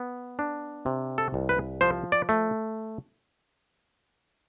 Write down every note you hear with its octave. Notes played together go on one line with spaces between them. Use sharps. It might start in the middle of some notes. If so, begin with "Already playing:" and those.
Already playing: B3
D4
C3
A4
C2
B4
F3 C5
D5
A3